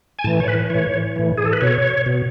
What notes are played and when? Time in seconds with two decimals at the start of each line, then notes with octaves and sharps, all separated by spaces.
0.19 G#5
0.24 A2 E3 A5
0.40 C#5
0.48 B4
0.70 A2 E3 C#5
1.16 A2 E3
1.37 G#4
1.45 A4
1.53 B4
1.61 B2 C#5
2.06 B2